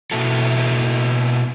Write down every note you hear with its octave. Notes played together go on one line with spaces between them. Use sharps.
B2 A#3 E4 F#4 A4